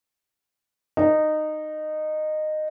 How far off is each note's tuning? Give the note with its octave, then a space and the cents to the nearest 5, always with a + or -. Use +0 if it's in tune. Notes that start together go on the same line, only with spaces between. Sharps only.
D#4 -15